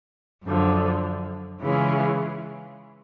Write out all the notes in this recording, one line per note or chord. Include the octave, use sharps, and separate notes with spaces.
F#2 D3 F3
C#3 E3 G#3 C#4 F4